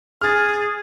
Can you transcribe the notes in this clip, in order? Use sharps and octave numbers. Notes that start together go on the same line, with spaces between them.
G#4 F6 A6